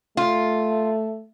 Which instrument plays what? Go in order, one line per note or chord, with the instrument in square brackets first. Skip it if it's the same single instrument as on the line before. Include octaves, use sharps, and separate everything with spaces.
[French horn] A3 [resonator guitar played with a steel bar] F4